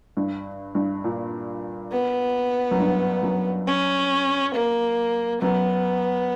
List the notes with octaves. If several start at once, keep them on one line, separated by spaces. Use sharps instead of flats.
G2
G2
A#2
B3
F#2
G2
F#2
C#4
A#3
F#2 B3